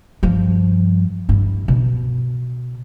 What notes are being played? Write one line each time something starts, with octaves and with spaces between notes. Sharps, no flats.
G2 F3
G2 E4
B2